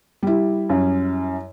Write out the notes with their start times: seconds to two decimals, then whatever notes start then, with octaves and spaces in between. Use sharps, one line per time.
0.23 G3 E4
0.69 F#2